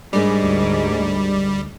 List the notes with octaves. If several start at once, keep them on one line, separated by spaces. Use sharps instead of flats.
G#2 G3 G#3 D4 A#4
D2